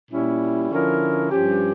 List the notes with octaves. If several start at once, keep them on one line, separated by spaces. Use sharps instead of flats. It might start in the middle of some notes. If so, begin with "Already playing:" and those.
A#2 G3 C#4 E4
D3 F3 C#4 E4 A#4
G2 F3 C#4 G4